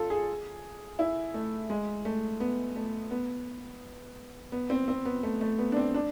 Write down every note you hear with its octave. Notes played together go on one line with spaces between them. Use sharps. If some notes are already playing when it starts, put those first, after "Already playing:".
Already playing: F4 A4
G#4
E4
A3
G#3
A3
B3
A3
B3
B3
C4
C4
B3
A3
A3
B3
D4
C4
D4